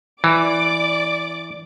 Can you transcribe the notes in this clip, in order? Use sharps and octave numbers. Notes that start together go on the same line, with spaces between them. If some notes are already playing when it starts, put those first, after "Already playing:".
E3 D5 D6